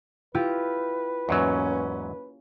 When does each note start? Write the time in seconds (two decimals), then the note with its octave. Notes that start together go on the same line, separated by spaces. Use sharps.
0.34 E4 F4 G4 B4
1.29 E2 G#2 F#3 A#3 C#4